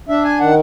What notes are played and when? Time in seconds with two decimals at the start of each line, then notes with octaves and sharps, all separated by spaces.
0.09 D4 E5
0.25 G#5
0.40 D#3 F#5